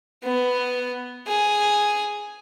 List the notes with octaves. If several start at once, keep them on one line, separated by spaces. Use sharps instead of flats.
B3
G#4